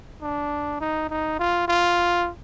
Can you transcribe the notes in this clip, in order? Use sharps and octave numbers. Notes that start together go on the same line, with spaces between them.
D4
D#4
D#4
F4
F4